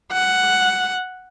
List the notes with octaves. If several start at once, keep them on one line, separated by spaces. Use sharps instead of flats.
F#5